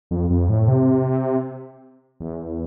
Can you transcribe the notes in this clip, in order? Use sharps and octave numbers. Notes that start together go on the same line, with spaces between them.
F2
F2
A2
C3
E2